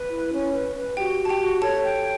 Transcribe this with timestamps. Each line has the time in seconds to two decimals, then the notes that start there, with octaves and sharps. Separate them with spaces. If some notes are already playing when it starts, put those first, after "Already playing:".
Already playing: B4
0.10 E4
0.33 C#4
0.54 B4
0.76 B4
0.97 F#4 G4 G5
1.19 F#4
1.25 A5
1.29 G4 G5
1.40 F#4
1.62 A4 C#5 A5
1.84 G5